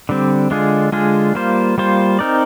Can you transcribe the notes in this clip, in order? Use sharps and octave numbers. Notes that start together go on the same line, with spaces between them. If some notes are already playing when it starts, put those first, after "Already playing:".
D3 G3 C4
D3 G#3 D4 F4 G#4
D3 G#3 D4 F4 G#4
G3 A#3 F4 C5
G3 A#3 F4 C5
C4 D#4 A#4 D5